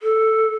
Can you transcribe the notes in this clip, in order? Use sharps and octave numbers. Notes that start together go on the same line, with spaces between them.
A4